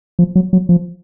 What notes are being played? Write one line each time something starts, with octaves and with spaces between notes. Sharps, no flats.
F3
F#3
F#3
F3